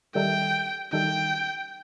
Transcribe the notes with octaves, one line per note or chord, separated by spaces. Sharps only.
D#3 G3 D#4 A4 E5 G5
D#3 G3 D#4 A4 E5 G5